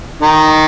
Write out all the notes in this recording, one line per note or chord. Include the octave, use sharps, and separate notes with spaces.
D#3 D#4